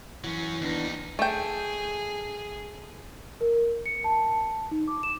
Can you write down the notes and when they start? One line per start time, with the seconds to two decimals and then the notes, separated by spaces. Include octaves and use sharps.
0.24 E3 F#3 C#4
0.61 D#2 B3 D4 D#4
1.19 A3 G#4 G5
3.41 A#4
3.86 C#7
4.04 A5
4.71 D#4
4.88 D6
5.03 E7